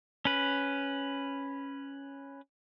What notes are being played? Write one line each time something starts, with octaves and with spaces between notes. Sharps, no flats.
C#4 B4